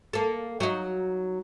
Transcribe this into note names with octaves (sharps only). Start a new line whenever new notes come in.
A#3 A4
F#3 D#4